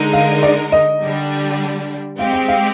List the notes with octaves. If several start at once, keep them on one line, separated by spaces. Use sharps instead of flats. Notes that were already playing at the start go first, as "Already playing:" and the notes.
Already playing: D3 G#3 D#4 A#4
F5
D5
D#5
D3 G3 D4
G#3 C4 G4 F5
G5
F5